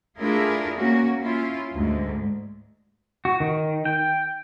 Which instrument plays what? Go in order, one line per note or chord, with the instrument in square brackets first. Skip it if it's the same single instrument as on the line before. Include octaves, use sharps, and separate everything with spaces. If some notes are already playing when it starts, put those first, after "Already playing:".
[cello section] A3 D4 E4 F4 G#4 A#4
A#3 C#4 F#4
C#4 E4 F4
D2 G#2
[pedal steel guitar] F#4
D#3
G5